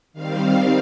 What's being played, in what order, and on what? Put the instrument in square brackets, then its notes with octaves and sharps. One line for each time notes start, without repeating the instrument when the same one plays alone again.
[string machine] D#3 G3 C4 F5